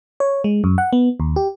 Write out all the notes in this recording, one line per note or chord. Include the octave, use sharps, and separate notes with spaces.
C#5
G#3
F#2
F#5
B3
D#2
G4